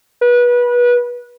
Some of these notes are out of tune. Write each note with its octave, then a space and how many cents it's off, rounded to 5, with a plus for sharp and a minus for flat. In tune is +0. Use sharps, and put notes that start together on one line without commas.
B4 -25